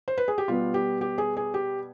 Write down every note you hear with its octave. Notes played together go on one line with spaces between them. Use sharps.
C5
B4
G#4
G4
B2 G3 B3 F4
G4
G4
G#4
G#4
G4